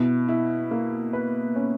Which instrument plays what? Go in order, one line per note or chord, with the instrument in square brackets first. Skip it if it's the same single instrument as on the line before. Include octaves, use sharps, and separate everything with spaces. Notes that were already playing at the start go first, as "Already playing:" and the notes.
Already playing: [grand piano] B2 [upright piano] E4
[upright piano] E4
A#3
B4
C#4